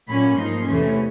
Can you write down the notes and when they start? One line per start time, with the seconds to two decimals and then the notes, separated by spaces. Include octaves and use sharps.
0.08 A#2 F#3 A#3 C#4 B5
0.36 G#2 F3 A#3 D#4 C6
0.65 E2 C3 E3 A3 C#4